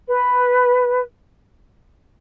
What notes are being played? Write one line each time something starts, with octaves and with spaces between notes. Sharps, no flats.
B4